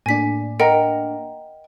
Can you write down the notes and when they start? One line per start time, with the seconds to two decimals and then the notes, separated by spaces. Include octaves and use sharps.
0.06 A2 A#3 D4 G#5 B6
0.60 A#4 D#5 F#5 G5